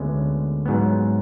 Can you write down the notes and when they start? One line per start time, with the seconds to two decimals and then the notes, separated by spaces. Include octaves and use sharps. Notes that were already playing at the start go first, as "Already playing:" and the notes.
Already playing: D2 D3 G#3 B3 C#4
0.66 G#2 F#3 B3